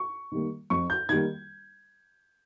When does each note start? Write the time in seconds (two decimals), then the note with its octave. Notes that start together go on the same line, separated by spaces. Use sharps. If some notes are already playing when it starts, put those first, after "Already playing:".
Already playing: C#6
0.32 D#3 G3 A#3
0.70 F2 C#6
0.90 G6
1.09 D#3 G3 A#3 G#6